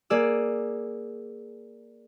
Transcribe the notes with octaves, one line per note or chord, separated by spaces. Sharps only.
A#3 G#4 D5 E6